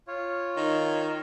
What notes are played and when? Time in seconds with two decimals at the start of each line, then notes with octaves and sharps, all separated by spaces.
0.07 F4 C#5
0.57 D#3